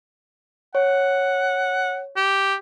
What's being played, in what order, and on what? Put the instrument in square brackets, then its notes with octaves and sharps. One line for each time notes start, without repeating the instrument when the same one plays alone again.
[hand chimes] C#5 [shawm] F#5
[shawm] G4